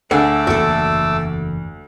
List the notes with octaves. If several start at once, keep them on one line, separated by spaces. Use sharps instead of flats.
D2 A3 G#4 F#5 D6 E6
F#1 E2 A#3 F#4 A4